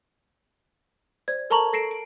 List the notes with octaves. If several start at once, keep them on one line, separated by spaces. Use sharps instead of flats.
C5 D5 G#6
A4 A#4 A5 A#5 C#6 F#7
A4 A#6 C7 D7 E7
D7